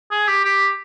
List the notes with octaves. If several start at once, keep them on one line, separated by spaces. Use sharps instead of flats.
G#4
G4
G4